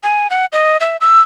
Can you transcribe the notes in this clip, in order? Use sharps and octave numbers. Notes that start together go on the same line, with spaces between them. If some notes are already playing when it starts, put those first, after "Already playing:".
G#5
F#5
D#5
E5
E6